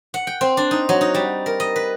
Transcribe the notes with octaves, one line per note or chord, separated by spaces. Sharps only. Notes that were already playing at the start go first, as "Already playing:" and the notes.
F#5
G5
C4
D4
D#4
F#3
D#4
G3
A#4
D#5
B4